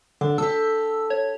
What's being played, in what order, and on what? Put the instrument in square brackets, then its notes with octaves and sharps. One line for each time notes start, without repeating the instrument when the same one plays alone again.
[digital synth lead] D3 [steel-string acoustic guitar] D4
[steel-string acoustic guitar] G4 A4 [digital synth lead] E6
[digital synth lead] C#5